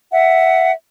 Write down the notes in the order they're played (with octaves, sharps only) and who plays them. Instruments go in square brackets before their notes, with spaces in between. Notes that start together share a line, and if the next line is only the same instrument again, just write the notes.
[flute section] E5 F#5